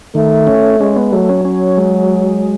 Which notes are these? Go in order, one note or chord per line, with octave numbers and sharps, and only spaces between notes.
D#3 A3
C#4
G#3 C#4
B3
F#3 A3
C#4
C#4
G#3